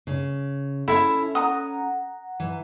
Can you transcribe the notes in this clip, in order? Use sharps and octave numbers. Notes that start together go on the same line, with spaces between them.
C#3
C#4 E4 A4 E5
F#5 A#5 D#6
E3